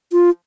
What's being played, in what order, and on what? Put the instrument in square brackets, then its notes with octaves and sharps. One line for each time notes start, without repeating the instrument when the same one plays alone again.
[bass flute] F4